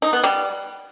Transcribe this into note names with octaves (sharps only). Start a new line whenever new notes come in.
D#4
B3
G3